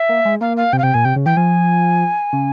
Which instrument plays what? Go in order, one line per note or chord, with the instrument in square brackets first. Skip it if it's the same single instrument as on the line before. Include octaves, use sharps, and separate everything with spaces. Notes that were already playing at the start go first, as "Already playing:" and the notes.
Already playing: [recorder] E5
[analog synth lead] A#3
G#3
[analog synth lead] A#3 [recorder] F5
[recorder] F5
[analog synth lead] C3 [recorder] G5
[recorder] F5
[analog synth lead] C3 [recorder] G5
[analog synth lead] A#2 [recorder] G#5
[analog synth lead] C3 [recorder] G5
[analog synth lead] C#3
[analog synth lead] E3 [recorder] G5
[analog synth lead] F3 [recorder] G#5
[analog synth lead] C#3